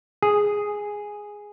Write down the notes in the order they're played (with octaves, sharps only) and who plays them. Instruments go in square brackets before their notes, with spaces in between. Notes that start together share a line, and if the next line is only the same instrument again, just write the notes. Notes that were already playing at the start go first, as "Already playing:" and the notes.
[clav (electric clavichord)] G#4